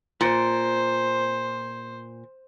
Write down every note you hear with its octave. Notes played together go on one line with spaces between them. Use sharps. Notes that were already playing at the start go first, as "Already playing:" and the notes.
A#2 C5